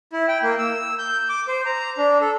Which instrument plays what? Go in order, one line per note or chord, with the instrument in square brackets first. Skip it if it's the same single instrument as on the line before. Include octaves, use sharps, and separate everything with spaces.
[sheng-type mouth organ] E4
G5
A#3
E6
G6
D6
C5
A#5
D4
A4